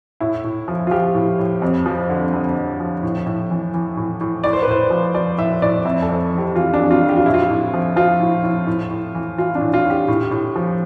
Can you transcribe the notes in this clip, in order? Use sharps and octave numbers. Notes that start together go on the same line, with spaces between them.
A2 E4
A2
F3
F4
F3 G4
A2
A2
F2
F3
D3
F2
F2
F3
A2
A2
E3
E3
A2
A2
A2 D5
C5
B4
A2 C5
F3
F3 D5
A2 E5
A2 D5
F2 E5
A4
F2
E3
G4
E3 F4
D4
F2
F4
F2
G4
F4
A2 E4
F4
A2
F3
F3 F4
A2
A2
A2
A2
E3
E3 F4
D4
A2
F4
A2
G4
A2
A2
F3